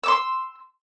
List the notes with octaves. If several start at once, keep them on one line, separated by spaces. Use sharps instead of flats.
C6 D6 E6